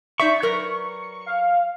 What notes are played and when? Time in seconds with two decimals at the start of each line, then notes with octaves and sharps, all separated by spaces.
0.20 D#4 D5 E5 C#6
0.42 F#3 A#4 B4
1.26 F5